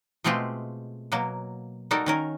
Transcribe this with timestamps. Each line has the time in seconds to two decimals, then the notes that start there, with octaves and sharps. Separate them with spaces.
0.24 B2 G#3 A3 C4 F4 G4
1.12 B2 F#3 A#3
1.91 G3 D#4 F#4 A4 A#4
2.06 D#3 C#4 A#4